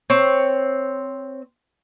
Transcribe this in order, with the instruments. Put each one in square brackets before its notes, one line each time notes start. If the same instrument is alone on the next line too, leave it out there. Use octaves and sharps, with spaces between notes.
[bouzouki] C4 C#5